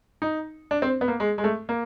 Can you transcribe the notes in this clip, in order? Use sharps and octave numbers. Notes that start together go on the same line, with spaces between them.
D#4
D4
C4
B3
A#3
G#3
G#3
A3
A#3